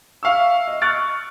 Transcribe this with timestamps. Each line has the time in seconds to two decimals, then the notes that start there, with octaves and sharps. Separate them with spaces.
0.23 E5 F5 C#6 E6
0.68 D#5
0.82 C#6 F6 F#6 A6 D7